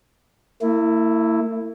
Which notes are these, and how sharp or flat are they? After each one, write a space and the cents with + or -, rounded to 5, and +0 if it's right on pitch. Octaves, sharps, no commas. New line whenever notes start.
A#3 -45 E4 +0